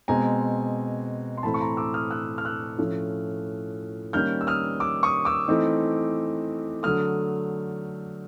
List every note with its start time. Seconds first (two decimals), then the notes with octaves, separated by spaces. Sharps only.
0.08 B2 G#3 C4 G#5 A#5
1.37 C6
1.43 A2 E3 A3 C4 A5 B5
1.54 C#6
1.61 A#5 C6
1.77 D6 E6
1.94 D#6 F6
2.10 E6 F#6
2.38 F6
2.45 E6 F#6
2.78 A2 F3 A3 C#4
4.13 D#3 G3 A#3 C#4 F6 G6
4.41 E6
4.47 D#6 F6
4.80 D6 E6
5.03 C#6 D#6
5.25 D6 E6
5.48 E3 A3 C4 D#4
6.83 D3 F#3 A3 D#6 F6